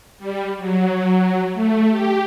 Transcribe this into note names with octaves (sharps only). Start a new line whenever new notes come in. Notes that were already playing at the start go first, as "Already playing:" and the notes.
G3
F#3
A3
G4